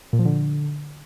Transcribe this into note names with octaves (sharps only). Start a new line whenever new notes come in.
A#2
F3
D3